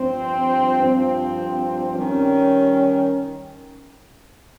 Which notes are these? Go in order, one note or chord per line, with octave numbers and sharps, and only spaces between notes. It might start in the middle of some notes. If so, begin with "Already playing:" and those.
Already playing: G2 F3 C4
G2 F3 C4
D#3 G3 C#4